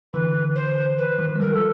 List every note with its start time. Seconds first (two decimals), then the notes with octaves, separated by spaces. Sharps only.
0.13 D3 E3 B4
0.55 C5
0.98 B4
1.18 D#3 F3
1.36 G#3
1.40 F3 G3 A#4
1.54 A4